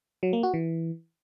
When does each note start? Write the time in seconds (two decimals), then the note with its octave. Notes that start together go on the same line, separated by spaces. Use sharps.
0.23 F#3
0.33 A#3
0.43 F#4
0.54 E3